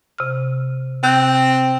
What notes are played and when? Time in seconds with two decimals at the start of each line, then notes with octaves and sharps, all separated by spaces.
0.18 C3 F6
1.03 C3 C4 F#6 G6